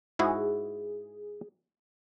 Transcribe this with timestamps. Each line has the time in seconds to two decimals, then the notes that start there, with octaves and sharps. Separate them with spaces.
0.19 G#2 E4 F#4 G#4